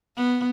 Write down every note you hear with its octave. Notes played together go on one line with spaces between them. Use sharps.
B3